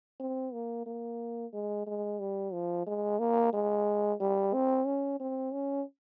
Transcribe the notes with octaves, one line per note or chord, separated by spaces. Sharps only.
C4
A#3
A#3
G#3
G#3
G3
F3
G#3
A#3
G#3
G3
C4
C#4
C4
C#4